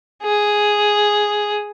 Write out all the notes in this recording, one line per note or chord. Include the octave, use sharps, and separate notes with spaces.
G#4